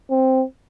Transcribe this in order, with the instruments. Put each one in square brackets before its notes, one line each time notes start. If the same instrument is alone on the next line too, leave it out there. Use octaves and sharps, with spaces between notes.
[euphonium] C4